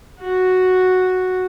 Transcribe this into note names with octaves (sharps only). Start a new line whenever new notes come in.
F#4